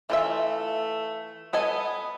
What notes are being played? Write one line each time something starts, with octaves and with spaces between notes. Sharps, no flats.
E3 A3 F4 E5
B3 A4 D#5 G#5